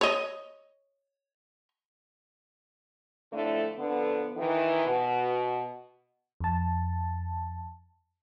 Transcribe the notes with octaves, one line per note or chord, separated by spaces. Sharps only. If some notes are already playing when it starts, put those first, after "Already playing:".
C#5 D#5
F2 A2 D3 A3
F2 D3 B3
D#3 E3
B2
F2 A5